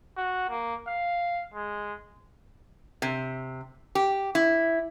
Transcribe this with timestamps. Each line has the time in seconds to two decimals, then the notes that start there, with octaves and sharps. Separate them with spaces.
0.17 F#4
0.50 A#3
0.87 F5
1.54 G#3
3.02 C3
3.95 G4
4.35 E4